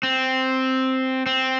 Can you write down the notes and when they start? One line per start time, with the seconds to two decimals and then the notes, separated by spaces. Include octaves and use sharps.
0.03 C4
1.26 C4